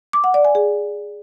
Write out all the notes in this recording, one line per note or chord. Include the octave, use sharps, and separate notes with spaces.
D6
F#5
D5
G#5
G#4